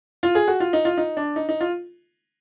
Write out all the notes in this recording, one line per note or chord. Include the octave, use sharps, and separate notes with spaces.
F4
G#4
F#4
F4
D#4
F4
D#4
D4
D#4
D#4
F4